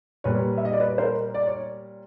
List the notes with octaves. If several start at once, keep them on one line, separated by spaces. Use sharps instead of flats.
A#2 G3 B4 C#5
E5
D#5
D5
B4 C#5
A#4 C5
D5
C#5